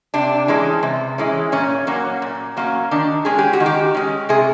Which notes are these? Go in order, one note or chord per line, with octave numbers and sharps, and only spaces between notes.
C3 D4
E3 G#3 C#4
C3
E3 G#3 C#4
A#2 C#4
F#3 A#3 C#4
A#2
F#3 A#3 C#4
D#3 D4
G#3 C#4 G#4
G4
F#4
D#3
G4
G#3 C#4
C3 G#4